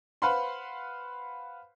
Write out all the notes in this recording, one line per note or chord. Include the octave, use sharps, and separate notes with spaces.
B4 C5 F5 F#5 B5 C6